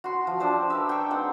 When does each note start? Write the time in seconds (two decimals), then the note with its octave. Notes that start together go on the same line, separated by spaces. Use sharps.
0.04 F#4 C6
0.27 F3
0.40 D4 G4 C5 E5
0.70 A#4 B4 E5
0.89 G5 C#6
1.10 G#3 C4 D#4 F#5